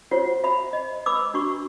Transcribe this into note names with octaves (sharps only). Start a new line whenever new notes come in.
F4 F#4 C5 C#5 F#5
E5 B5
D#5
B4 B5 D6 E6
D4 F#4 C#6